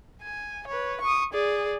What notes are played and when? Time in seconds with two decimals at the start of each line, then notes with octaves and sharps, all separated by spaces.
0.21 G#5
0.67 B4 C#5
1.01 C#6 D#6
1.33 G#4 D5